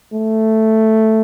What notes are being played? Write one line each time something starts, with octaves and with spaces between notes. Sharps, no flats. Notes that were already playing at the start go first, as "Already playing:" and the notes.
A3